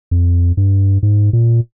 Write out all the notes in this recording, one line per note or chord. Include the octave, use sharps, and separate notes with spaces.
F2
G2
G#2
A#2